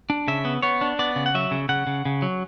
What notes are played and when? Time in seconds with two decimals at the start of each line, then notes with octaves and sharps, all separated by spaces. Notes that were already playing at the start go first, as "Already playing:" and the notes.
0.10 D4
0.28 C#3 E5
0.45 B3
0.62 B3 C#5
0.81 D4
0.99 B3 D5
1.16 C#3
1.26 F#5
1.35 F#3 E5
1.51 C#3
1.69 C#3 F#5
1.87 C#3
2.05 C#3
2.22 F#3